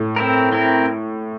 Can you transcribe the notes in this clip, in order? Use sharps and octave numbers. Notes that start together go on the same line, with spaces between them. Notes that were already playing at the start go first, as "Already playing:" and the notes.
Already playing: A2
C4 E4 A#4
C4 E4 A#4